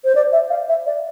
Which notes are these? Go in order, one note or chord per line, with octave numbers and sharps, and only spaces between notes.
C5
D5
E5
F5
E5
D5